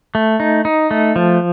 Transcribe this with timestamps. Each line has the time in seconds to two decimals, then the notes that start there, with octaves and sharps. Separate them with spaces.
0.15 A3
0.40 D#4
0.65 D#4
0.91 A3
1.16 F3